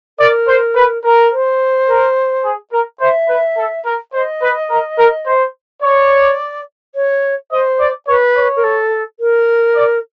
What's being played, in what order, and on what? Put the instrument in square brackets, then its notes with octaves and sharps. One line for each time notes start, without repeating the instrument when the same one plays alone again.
[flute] A#4 [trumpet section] D5
[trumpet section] C5
B4
A#4
[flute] C5
[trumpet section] A#4
G#4
A#4
[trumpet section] C5 [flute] E5
[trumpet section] B4
A4
A#4
[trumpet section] C5 [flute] D#5
[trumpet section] B4
A#4
A#4
C5
[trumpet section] C#5 [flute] D5
[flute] C#5
[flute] C5 [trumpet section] D#5
[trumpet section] D5
[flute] B4 [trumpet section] C#5
[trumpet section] C#5
[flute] A#4
A4
A#4
[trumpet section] D5